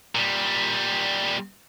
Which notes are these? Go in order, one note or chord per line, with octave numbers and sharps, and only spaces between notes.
A#2 G3